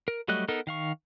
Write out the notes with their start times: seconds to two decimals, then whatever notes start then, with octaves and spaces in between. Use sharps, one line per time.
0.08 A#4
0.28 F#3 G3 A3 D#5 F#6
0.48 B3 D#4 A4 A#4
0.67 D#3 F5 C#6